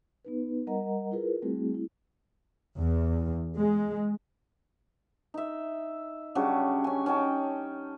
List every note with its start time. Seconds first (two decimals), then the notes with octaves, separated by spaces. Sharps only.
0.25 B3 D#4 B4
0.67 G3 A#4 D#5 F#5 A#5
1.11 E4 F4 G#4 A#4 B4
1.42 G3 A3 C4 E4 F#4 G#4
1.74 E4
2.78 E2
3.57 G#3
5.34 D#4 E5
6.35 C#3 F#3 G3 D4
6.84 C#4 G#5
7.06 C#4 D#4 G5 A5